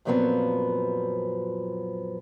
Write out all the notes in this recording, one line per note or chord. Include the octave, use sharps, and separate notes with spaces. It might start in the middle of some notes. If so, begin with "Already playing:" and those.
F#2 A#2 F3 F#3 B3 C4